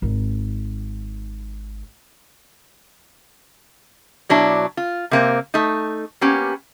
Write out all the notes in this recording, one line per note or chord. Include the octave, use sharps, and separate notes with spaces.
G#1 D#4
B2 F#3 D4 E4
F4
C3 A#3 C4
A3 D#4
A#3 B3 C#4 G4